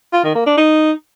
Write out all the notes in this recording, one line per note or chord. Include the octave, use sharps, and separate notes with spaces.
F4
D#3
A#3
D4
D#4